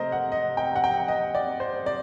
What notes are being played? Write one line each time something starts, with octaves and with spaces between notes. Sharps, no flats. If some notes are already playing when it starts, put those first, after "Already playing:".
Already playing: C3 A3 A#4 C5 D#5
F#5
D#5
G5
F#5
G5
D#5
D5
C5
D5